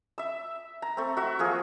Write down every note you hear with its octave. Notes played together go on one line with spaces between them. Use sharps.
E5 E6
A#5
A3 C4
F#4 E5
F3 A#3 G#4